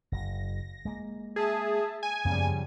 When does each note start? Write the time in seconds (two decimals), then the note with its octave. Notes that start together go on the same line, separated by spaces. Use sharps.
0.12 F#1 A#6
0.85 G#3 A#3
1.36 G#4 E5 A5
2.03 G#5
2.25 F#2 C#3 F3 G3 A#3 B3